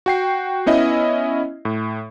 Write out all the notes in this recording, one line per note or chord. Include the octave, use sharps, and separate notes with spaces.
F#4 G5 C7
B3 C#4 E4 D#5 E5
A2